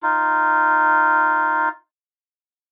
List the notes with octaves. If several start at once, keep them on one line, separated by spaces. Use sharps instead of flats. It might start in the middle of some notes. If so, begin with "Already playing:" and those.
D#4 F4